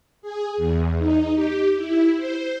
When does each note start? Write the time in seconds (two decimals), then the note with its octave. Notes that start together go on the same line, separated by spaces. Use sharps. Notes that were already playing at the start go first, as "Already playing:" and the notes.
0.22 G#4
0.57 E2
0.99 D#4
1.35 G4
1.76 E4
2.16 C5